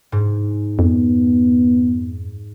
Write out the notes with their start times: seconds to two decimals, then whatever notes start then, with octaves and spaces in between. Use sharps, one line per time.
0.12 G#2
0.79 F2 B3